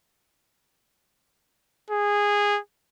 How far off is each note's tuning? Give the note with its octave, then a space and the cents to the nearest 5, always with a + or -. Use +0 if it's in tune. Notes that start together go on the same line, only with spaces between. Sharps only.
G#4 -15